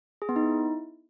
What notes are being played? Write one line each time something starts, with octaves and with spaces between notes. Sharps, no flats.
G#4
B3
D#4
E4